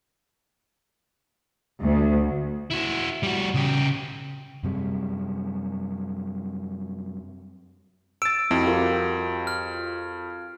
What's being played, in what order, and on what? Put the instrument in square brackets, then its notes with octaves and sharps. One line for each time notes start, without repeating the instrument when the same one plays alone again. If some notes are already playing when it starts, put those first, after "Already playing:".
[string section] D2
[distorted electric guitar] E4 F#4
G3 F#4
C#3 G4
[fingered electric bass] F#2 C3 G3
[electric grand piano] E6 A6 [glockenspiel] D7
[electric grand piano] F2 [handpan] C4 F#4 [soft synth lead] E4
[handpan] C4 G4 A#4 [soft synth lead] F4
[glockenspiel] F6